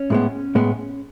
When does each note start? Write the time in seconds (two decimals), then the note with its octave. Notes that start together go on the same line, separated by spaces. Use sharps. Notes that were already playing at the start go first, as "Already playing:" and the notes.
Already playing: C#4
0.10 A2 G#3 B3
0.55 A2 G#3 B3